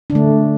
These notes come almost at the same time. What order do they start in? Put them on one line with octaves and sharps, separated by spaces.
D4 D3 A3